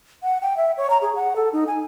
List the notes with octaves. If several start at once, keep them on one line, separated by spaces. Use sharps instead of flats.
F#5
G5
E5
C#5
A#5
G#4
F#5
A4
D#4
G#5